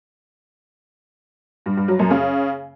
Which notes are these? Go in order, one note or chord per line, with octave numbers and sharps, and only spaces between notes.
G2
G2
F#3
F#2
C#3